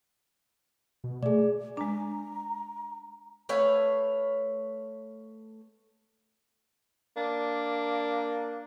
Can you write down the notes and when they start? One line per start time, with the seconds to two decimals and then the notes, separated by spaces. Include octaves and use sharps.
1.04 B2
1.23 A3 G#4 D5
1.77 G#3 D4 A#5
3.49 A3 B4 C#5 F5
7.16 A#3 D4